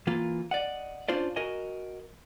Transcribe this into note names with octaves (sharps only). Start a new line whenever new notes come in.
E3 A#3 F4
D5 D#5 F#5
C#4 D4 F4 C5 D5
F#4 A#4 D#5 G#5